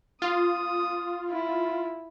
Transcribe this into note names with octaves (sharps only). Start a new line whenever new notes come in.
F4 D#6
E4